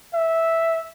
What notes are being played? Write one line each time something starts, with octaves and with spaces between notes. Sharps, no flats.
E5